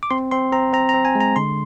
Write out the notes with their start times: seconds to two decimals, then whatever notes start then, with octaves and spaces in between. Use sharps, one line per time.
0.03 D6
0.11 C4 C6
0.31 C4 C6
0.52 C4 A#5
0.73 C4 A#5
0.89 A#5
0.94 C4
1.05 G#5
1.15 G#3
1.20 A#5
1.36 D3 C6